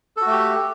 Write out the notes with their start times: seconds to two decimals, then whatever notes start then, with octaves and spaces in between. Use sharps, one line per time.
0.17 A4
0.22 F#4
0.27 A3
0.31 G4